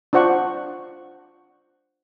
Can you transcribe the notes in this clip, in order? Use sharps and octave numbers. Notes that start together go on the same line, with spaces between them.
D4 F4 C5 F#5 C#6